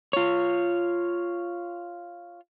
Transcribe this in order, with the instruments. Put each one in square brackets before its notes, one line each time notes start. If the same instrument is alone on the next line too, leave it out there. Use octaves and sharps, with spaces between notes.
[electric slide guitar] F4 C#5